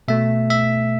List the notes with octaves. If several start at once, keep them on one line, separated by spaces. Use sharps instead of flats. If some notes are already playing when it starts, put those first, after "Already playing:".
B2 A3 E5
E5